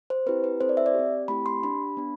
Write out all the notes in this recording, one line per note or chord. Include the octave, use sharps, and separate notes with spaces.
C5
C4 E4 G4 B4
B4
C4 E4 A4 C5
D5
E5
D5
G4
C4
A3 C4 E4 G4 B5
C6
D4 G4 B5
B3 D4